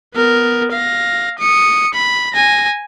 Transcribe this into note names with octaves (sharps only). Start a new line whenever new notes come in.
B3 A#4
F5 A#6
D#6 C#7
B5
G#5 A#6